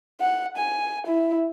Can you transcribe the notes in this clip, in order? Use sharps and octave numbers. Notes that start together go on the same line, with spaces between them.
F#5
G#5
E4